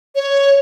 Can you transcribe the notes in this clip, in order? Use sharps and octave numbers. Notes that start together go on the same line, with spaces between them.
C#5